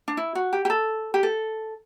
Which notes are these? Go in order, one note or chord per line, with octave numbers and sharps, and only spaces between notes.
D4
E4
F#4
G4
G4
A4
G4
A4